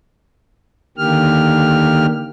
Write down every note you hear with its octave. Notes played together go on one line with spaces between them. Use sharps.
D3 D#3 A#3 G4 F6